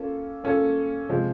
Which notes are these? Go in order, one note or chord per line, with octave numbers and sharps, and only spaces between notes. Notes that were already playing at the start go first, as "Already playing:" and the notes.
Already playing: A#3 C#4 F4 A4
A#3 C#4 F4 A4
C3 F3 G#3